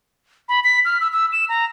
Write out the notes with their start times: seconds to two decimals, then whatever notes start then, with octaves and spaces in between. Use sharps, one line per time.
0.49 B5
0.64 B6
0.85 F6
1.01 E6
1.12 E6
1.33 E7
1.49 A#5